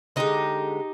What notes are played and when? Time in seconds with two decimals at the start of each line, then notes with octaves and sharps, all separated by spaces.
0.16 D3 G#3 D#4 G4